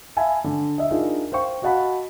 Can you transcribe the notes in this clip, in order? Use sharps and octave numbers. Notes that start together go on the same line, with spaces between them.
E5 F5 G#5 A5 B5
D3
D#5 E5
D4 D#4 F4 G#4 A#4 E5
C5 F5 G5 C#6
F#4 D#5 F5 F#5 A5 B5